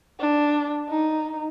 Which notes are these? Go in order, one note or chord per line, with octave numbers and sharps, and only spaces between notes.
D4
D#4